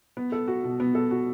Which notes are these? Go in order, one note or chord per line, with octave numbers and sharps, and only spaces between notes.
B3
A4
F#4
B2
B3
A4
F#4